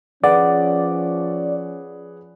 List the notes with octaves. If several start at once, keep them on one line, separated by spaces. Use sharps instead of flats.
F3 C#4 G#4 B4 D5 F#5